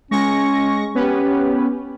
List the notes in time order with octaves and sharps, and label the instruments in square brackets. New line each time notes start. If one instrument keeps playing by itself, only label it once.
[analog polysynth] G#3 C#6 A#6 [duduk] C#4
[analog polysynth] B3 C#4 B4 [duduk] G4